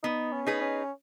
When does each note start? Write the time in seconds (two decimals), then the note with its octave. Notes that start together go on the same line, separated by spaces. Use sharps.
0.03 B3 D#4
0.33 C#4
0.47 D#4 G#4 B4
0.61 C#4